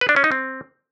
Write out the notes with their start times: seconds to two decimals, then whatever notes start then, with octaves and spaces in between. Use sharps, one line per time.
0.01 B4
0.09 D4
0.16 C#4
0.24 D#4
0.32 C4